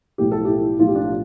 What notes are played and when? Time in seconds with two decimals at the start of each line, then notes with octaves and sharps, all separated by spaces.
0.18 B1 A2 F3 A3 G4
0.32 A4
0.45 E4 G4
0.79 B1 A2 F3 A3 F4
0.88 G4
0.95 D4 F4